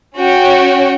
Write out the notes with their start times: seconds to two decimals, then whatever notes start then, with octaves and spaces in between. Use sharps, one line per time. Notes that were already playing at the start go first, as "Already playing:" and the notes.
0.18 C#4 F#4 C#5 G5